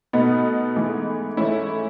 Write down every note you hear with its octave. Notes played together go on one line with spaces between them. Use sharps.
B2 A3 B3 D#4
G#2 E3 A3
G#2 E3 A3 C#4 E4